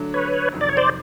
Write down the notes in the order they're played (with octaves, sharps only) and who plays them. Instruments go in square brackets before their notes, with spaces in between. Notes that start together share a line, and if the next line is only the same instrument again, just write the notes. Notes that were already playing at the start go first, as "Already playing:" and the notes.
Already playing: [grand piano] D3 F#3 A3 D4
[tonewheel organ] B4 C#5
[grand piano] F2 C3 D#3 F#3
[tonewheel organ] D5
C#5
C5 D5